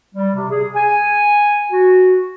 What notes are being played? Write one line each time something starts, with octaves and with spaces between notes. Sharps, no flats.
G3
C3
G#4
G#5
F#4